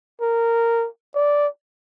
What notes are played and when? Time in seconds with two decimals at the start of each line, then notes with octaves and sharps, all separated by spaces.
0.21 A#4
1.15 D5